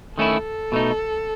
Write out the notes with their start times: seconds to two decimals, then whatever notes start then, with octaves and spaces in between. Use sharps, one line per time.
0.18 D#3 A3 C#4 E4 A4
0.72 B2 A3 D#4